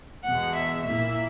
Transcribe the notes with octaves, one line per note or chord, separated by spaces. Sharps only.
E2 B2 G#3 F#5
E5
A#2 A#3 E4 E5